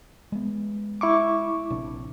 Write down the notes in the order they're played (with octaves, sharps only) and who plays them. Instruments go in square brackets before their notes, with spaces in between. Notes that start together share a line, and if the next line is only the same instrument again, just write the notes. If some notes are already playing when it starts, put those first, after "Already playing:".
[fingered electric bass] G#3 B3
[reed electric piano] E4 C#6 D6
[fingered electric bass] A#1 C3 D4